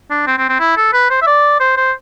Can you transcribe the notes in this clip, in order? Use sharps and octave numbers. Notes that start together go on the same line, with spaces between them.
D4
C4
C4
C4
E4
A4
B4
C5
E5
D5
C5
C5